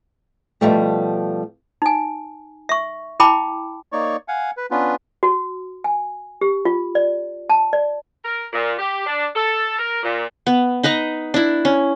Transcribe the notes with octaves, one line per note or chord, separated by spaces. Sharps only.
B2 D3 F3 G3 A3
D#4 G#5
E5 C#6
E4 G5 A5 B5 D6
A#3 D#4 C#5 D5 C#6
F5 F#5 G#5
B4
B3 C#4 D4 F4 B4
F#4
G#5
G4
F4
D5
A5
D5
A#4
A#2
G4
D4
A4
A#4
A#2
B3
D#4 B4 D#5 A#5
D4 E4
C#4